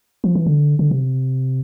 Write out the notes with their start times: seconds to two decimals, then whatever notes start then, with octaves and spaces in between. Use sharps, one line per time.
0.24 F3
0.35 E3
0.46 D3
0.79 D3
0.91 C3